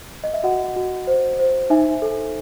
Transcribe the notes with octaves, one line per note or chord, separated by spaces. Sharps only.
D#5
E5
F#4 D#5 F#5
F#4
C5
C5
D#4 E5 G#5
A4